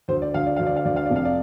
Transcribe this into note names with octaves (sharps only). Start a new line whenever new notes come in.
D2 C5
D5
D2 F5
D5
D2 F5
D5
F5
D2 D5
F5
F1 D5
F5
D5